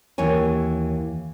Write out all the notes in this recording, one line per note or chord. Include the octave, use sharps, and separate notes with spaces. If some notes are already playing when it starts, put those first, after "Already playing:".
D#2 E3 C#5 G#5